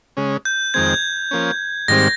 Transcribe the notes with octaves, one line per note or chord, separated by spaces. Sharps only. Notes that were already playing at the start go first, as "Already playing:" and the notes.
C#3 G#3 C#4
G6
F2 D#3 G#3 C4 G#6
F3 A#3 C#4
G#2 D#3 G3 C4 A#6